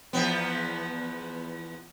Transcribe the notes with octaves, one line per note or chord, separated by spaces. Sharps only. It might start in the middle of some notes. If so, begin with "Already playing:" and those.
E2 F3 B3